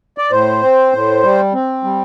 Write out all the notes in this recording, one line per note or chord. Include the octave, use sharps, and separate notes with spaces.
D5
A2 C5
C4
A2
G3
C4
G3